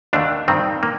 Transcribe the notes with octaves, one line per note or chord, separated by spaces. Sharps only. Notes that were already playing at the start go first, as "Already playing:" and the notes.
D#2 D3 A3 D4
G2 D#3 G3 C4
D3 A#3